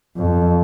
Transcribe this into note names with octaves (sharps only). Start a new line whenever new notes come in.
F2